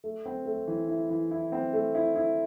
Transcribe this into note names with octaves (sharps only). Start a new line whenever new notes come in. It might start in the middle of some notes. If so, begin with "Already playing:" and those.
A3
C4
A3
E3
E4
E3
E4
C4
A3
E4
E4